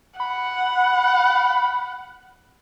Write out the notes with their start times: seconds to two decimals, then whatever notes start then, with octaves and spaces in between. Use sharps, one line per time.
0.20 F#5 B5